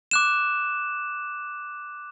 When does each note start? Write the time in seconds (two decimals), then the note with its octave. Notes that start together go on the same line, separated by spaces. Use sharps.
0.11 D6 F#6 E7